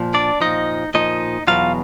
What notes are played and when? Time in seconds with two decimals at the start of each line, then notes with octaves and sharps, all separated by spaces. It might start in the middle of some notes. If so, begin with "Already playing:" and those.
Already playing: A#2 F3
0.14 D4 D5
0.41 A#2 F3 D#4 D#5
0.94 A#2 F3 D#4 D#5
1.47 E2 B2 F#3 F4 F5